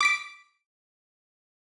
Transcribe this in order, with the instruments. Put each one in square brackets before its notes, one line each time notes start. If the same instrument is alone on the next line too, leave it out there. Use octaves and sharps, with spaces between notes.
[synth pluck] D6 B6 D7